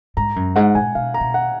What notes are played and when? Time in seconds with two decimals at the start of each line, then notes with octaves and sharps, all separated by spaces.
0.17 G#2 A#5
0.36 F#2
0.56 G#2 F#5
0.75 A#2 G#5
0.95 B2 F5
1.14 A#5
1.21 B2
1.34 F#5